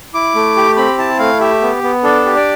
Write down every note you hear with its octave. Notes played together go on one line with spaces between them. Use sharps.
E4 D6
A3
G4
C4 B5
E4 A5
A3 F5
G4 E5
B3
B3
D4 A4
G4
D5